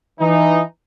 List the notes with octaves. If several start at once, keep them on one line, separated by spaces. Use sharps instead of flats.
E3 D#4